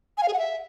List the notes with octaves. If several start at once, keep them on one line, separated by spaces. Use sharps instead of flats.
G#5
F5
G#4
F#5
E5